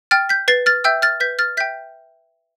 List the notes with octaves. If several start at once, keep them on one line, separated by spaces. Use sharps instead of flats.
G5 F6 A6
G6 B6
B4 A6 C7
F6 A6
E5 G5 E6 G6
F6 A6
B4 G6 B6
F6 A6
E5 G5 G6 B6